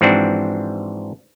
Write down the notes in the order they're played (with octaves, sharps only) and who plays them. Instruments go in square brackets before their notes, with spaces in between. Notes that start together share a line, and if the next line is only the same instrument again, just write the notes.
[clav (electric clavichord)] G#2 E3 F3 C4 D4 F#4